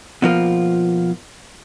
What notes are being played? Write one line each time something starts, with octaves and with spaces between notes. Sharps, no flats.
B2 F3 A#3 F4